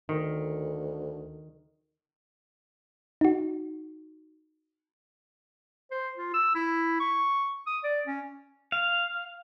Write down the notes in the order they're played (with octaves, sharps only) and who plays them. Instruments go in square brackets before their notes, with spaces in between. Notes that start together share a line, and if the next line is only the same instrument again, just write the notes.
[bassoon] D2 [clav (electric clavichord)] D#3
[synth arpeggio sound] D#4 F#4
[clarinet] C5
F4
E6
E4
C#6
D#6
D5
C#4
[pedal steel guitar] F5